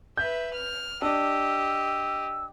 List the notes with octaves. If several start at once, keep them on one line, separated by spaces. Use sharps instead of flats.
B4 E5 G6
F6
D4 G4 D#5 E6